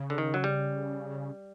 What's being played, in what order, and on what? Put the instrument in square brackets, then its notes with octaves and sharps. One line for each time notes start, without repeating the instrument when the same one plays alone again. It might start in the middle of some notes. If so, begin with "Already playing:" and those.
Already playing: [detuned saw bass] C#3
[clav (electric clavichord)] D3
D#3
F#3
G3